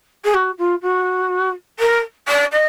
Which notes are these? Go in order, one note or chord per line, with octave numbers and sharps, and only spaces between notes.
G#4
F#4
F4
F#4
A#4
D5
D#5